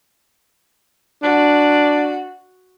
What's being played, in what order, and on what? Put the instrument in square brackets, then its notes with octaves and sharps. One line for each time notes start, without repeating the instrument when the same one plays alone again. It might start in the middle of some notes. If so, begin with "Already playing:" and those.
[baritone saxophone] D4 [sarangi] F#4